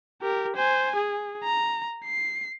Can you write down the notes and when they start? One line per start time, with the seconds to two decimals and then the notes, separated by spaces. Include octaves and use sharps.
0.22 G4 A#4
0.56 C5 G#5
0.96 G#4
1.44 A#5
2.05 C7